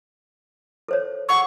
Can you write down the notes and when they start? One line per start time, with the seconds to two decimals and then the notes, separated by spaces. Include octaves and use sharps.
0.88 A4 C5 C#5
1.29 G#4 F#5 C#6 E6